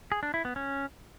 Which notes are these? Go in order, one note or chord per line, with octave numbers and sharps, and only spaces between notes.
G#4
D4
E4
B3
C#4